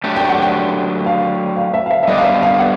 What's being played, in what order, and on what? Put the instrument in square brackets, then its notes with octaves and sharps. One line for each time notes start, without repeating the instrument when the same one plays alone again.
[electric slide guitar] F#3 A3 D4 G4
[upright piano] G5
F#5
G5
F5
F5
E5
F5
E5
E5
[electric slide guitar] G3 B3 D4 [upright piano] D#5
[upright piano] F5
E5
F5
F#5